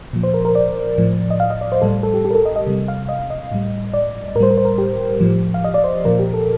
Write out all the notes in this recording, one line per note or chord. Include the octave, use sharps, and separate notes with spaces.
A#2 F3
C5
A#4
A#4
D5
A2 F3
D#5
F5
D#5
D5
C5
A2 G3 A4
A4
G4
G4
A#4
A4
D#5
D#5
C3 G3
F5
D#5
D#5
A2 G3
D5
A2 G3 A#4 C5
A#4
C5
A#4
G4
A2 F3
F5
D#5
D5
C5
A#2 F3 A#4
G4
A4